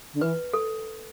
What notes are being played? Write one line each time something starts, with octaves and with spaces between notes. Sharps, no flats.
D3
E3 B4
A4